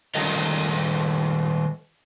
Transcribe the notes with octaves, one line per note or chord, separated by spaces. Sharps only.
D#3 G3 A4 A#4 D#5